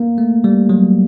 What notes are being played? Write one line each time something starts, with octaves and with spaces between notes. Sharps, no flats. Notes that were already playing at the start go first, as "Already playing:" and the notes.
Already playing: A#3
A3
G3
F#3